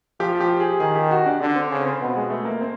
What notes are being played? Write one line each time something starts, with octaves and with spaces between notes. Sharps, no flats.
F3 G4
G4
G#4
D#3 G#4
G4
F#4
D4
D3 D4
C4
C#3
C4
B2 B3
G#3
A3
A#3
C4